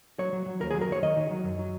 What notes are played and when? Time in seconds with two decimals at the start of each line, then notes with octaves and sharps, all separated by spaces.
0.19 F#3 C#5
0.33 F#3
0.46 F#3
0.61 D#2 A#4
0.71 F#3 G#4
0.81 A#4
0.89 D#2 C#5
1.02 D#3 D#5
1.17 D#3
1.31 F#3
1.44 F#2
1.59 F#3